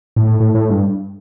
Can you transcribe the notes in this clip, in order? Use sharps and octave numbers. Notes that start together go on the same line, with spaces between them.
A2
A2
A2
G2